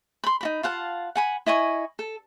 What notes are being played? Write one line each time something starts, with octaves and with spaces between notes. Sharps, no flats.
B5 C6
D#4 F#4 B5
F4 F5 F#5 A5
F#5 G#5 B5
E4 D#5 G#5 C#6
A4